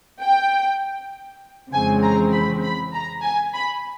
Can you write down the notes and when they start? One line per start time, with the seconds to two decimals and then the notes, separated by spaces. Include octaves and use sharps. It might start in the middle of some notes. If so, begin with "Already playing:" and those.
0.21 G5
1.72 F2 C#3 E3 G#3 C4 G#5
2.03 A#5
2.33 B5
2.63 B5
2.94 A#5
3.23 G#5
3.54 B5